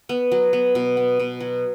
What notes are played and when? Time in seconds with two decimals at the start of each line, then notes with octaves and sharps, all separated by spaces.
0.09 B3
0.32 F#3
0.53 B3
0.75 B2
0.97 B3
1.19 B2
1.40 F#3